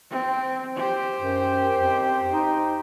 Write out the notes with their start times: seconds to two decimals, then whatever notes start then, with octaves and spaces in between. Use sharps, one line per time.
0.11 C4
0.76 G4 C5
1.21 F#2
1.74 F2
2.31 D#4